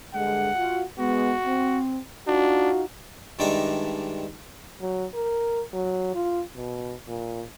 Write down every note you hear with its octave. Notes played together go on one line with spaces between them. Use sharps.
G2 D3 G#3 F#5
F4 F#4
G#3 B3 F#4
C4
D4 D#4 F4 F#4
G2 D#3 G#3 D4 D#4 E5
F#3
A#4
F#3
F4
B2
A#2